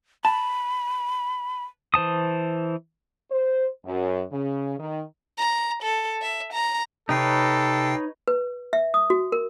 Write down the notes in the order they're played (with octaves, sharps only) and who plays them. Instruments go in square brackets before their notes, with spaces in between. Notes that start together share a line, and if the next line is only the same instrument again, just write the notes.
[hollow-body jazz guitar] A5 [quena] B5
[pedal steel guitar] E3 C5 A5 D#6
[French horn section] C5
F#2
C#3
D#3
[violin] A#5
A4
E5
A#5
[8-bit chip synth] C3 G5 C7 [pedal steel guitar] D#4 B4 C#5 [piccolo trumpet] A4
[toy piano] B4
E5
D#6
F#4
A#4